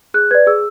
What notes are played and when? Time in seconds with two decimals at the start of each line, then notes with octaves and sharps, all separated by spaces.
0.14 G#4 F#6
0.31 B4 D5 G#6
0.47 G#4 E6